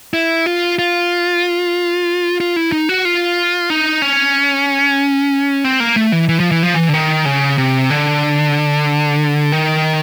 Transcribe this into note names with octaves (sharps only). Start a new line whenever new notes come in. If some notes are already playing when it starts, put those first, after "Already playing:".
E4
F4
F4
F4
E4
D#4
F#4
F4
D#4
C#4
C4
A#3
A3
E3
E3
F3
E3
F3
E3
D3
D#3
C#3
C3
D3
D#3